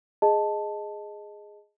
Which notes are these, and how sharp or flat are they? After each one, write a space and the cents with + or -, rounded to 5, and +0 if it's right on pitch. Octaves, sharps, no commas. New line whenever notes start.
G#4 +0 D#5 +0 A5 +0